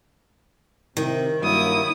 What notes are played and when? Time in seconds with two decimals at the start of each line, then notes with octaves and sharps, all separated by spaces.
0.97 C3 D#3 A#4
1.42 G2 F#3 A#3 E4 D#6